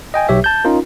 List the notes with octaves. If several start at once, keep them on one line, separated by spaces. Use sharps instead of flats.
D#5 G5 G#5
B1 G4 C#5 E5
A5 G6
C#4 D#4 F4 A#4